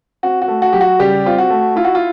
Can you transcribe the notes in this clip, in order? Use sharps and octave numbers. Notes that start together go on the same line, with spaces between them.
C4 F#4
F#4
A3
F#4
F#3 G4
F#4
C#3 G3 G4
C4 F4
F#4
A3
E4 F4
F#4
F4